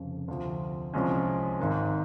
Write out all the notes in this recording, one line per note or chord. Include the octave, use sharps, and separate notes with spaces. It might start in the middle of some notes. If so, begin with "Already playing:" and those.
Already playing: F1 F2 C#3
D2 C3 F3
C2 C3 F3 G#3 C#4
G#1 G#2 D#3